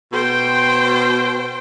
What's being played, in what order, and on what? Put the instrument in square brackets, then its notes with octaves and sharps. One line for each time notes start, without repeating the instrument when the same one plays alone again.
[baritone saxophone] B2 [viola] C5 G5